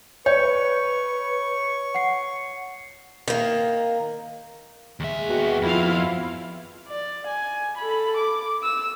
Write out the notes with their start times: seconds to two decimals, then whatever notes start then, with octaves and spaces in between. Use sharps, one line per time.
0.26 B4 C#5 C#6 G6
1.94 F#5 C7
3.28 D#3 A#3
5.00 D#2 G#3 E5
5.29 B2 F#4 G5
5.62 F2 E4 F4 F5
6.89 D5
7.28 G#5
7.78 A4 B5
8.18 D6
8.63 E6